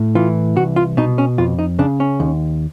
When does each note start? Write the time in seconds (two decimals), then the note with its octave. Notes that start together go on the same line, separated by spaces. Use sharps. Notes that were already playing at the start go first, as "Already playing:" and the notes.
Already playing: A2
0.15 E3 F4
0.56 C2 F#4
0.76 F4
0.97 B2 D#4
1.18 C#4
1.38 F2 F4
1.59 D#4
1.79 C#3 D4
2.00 C#4
2.20 D#2